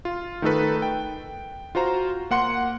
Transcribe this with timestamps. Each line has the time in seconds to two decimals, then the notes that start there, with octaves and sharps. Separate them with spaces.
0.05 F4
0.42 D#3 A3 D#4 A4 B4
0.82 G5
1.75 F4 F#4 C5 A#5
2.31 A#3 F#5 C6 C#7